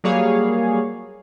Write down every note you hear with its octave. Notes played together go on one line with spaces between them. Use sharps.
F#3 G3 A#3 G#4 C#5 F5